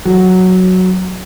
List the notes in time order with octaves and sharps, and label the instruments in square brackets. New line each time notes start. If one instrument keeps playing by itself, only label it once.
[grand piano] F#3